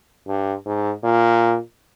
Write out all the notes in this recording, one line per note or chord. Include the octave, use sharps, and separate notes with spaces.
G2
G#2
A#2